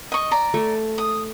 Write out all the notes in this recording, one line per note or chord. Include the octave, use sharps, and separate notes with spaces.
D#5 C#6
D5 A#5
A3
D#6